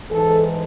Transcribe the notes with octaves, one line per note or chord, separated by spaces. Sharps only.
G#2 E3 A4